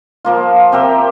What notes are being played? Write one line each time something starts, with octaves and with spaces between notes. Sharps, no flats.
F3 A#3 F4
C4 G4 A#4 E5